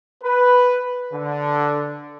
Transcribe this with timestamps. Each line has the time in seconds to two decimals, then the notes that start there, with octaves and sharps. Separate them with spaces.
0.22 B4
1.13 D3